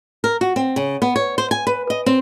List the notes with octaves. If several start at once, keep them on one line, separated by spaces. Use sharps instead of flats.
A#4
F#4
C4
C#3
B3
C#5
C5
G#5
B4
D#5
C4